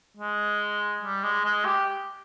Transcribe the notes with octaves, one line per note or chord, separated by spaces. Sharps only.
G#3
G3
G#3
G#3
G4